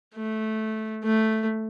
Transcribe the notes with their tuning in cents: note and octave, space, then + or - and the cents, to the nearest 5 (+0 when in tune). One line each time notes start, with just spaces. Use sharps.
A3 -10
A3 +0